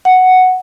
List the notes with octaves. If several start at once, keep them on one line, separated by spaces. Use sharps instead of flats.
F#5